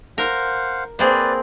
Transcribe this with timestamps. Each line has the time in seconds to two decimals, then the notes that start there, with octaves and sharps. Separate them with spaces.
0.18 A#4 C5 F5 F#5
0.99 A#3 C4 G#4 B4 D5